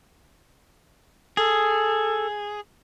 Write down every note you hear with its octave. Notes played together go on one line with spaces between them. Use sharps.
G#4 A4